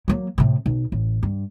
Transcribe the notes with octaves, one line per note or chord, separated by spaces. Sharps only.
F#3 A#3
A2 C3
B1
A1
G2